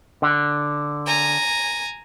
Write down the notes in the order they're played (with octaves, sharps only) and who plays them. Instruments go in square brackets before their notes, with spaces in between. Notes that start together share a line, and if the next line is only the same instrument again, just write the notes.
[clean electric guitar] D3
[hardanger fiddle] G#5 A#5